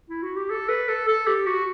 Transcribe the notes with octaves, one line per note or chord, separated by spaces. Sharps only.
E4
F#4
G4
A4
B4
A4
A4
G4
F#4